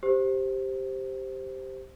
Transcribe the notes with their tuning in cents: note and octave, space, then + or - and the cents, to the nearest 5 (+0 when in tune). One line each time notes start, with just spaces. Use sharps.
G4 +0 C5 +0